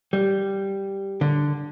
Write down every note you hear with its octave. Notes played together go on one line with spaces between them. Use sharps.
G3
D3